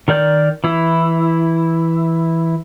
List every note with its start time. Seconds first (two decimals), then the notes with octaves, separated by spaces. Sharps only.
0.08 D#3 A#4 D5 G6
0.64 E3 E4